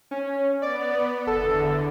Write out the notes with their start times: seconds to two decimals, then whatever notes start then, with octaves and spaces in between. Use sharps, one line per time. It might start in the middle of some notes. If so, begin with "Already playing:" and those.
0.11 C#4
0.62 B3 D5
1.27 F#1 E2 D3 A4